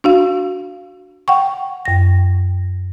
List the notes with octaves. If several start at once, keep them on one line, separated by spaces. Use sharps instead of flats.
D4 F#4 F5
F#5 G5 C#6
F#2 A#6